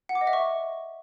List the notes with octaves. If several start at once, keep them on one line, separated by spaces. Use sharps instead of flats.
F#5
D6
D#5
E5
C#6